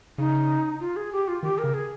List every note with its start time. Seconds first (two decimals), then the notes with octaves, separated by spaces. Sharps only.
0.18 C#3 D#4
0.80 F4
0.96 G#4
1.12 G4
1.28 F4
1.43 D#3 G4
1.58 A#4
1.64 C#3
1.74 G#4